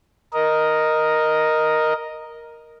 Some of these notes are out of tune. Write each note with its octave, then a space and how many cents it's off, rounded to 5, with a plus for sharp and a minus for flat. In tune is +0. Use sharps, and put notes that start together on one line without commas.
A#4 +5 D#5 +0